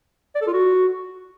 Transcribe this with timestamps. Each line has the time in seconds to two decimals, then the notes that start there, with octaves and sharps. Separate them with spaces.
0.35 D5
0.41 A4
0.47 F4
0.53 F#4